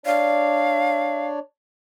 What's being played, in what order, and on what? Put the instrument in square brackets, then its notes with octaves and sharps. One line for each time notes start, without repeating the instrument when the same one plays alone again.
[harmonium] D4 C#5 D5 [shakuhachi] F5